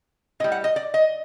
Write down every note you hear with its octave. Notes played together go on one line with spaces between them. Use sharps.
A2 G3 D#5
F#5
D#5
D5
D#5